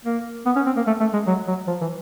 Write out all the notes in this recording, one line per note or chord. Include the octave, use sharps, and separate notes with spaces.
A#3
B3
C#4
C4
A#3
A3
A3
G#3
F#3
F#3
F3
E3